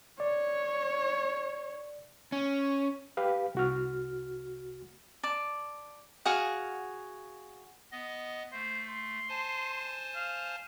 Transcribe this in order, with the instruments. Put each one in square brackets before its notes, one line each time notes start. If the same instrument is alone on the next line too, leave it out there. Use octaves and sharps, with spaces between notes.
[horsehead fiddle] C#5 [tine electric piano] D5
[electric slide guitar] C#4
[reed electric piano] G4 B4 F5
C2 F#4 F6
[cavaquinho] D5 A5
F#4 G#4 F5 F#5
[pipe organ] B3 D#5
[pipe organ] A3 [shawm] C5
[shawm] C6
[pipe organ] C5 G#5 A5
[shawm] F5